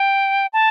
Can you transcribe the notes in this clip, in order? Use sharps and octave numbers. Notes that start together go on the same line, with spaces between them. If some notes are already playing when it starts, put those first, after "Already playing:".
Already playing: G5
A5